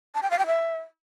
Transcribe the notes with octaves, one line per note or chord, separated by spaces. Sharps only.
A5
G5
F5
G5
E5